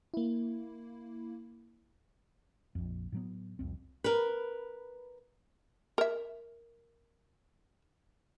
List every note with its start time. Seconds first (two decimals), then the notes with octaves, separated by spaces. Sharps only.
0.14 A#3 E4
2.75 A#1 F2
3.12 A2 F#3 B3
3.59 C2 F2 C4
4.04 A#4 B4
5.98 A#4 E5